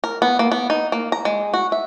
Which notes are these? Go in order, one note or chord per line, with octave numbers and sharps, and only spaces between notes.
A#4
B3
A#3
B3
D#4
A#3
A#5
G#3
F#4
E5